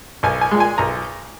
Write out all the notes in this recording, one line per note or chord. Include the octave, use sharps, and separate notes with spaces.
B1 G#5
G#5
A#2 G#3
G#5
B1 A#5